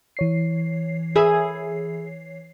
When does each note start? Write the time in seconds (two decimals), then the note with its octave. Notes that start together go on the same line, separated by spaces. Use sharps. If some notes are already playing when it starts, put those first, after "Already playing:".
0.17 E3 C#5 C7
1.16 G#4 B4 E5